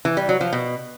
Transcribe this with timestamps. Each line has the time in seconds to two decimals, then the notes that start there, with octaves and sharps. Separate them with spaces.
0.05 E3
0.17 G3
0.29 F#3
0.41 F3
0.53 B2